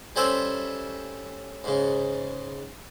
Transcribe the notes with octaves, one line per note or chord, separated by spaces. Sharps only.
G3 A3 C#4 C5 C#5 E5
G#2 C#3